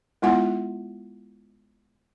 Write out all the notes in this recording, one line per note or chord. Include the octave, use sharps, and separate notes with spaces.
G#3 B3 E4 F4 F#5 G#5